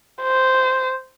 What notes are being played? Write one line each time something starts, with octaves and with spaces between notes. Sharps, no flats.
C5